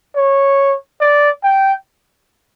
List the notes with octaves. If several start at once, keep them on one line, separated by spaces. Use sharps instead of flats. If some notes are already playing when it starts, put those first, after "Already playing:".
C#5
D5
G5